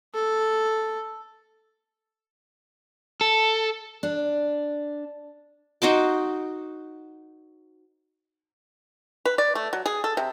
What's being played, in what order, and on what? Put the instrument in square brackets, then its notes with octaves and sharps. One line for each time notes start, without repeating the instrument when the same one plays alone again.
[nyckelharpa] A4
[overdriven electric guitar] A4
[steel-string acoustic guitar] D4
[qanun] D#4 F#4 C5 D6
[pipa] B4
D5
A3
F#3
G#4
A4
C3